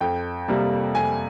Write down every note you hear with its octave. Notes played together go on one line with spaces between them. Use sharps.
F2 G5
C3 G3 A#3
F2 G#5